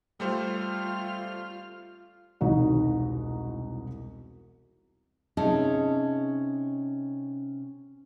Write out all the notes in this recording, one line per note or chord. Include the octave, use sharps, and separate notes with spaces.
G3 A3 F4 C5 F6
E1 C2 D#4 F#4
C3 C#4 D#4 G#4 D#5 A5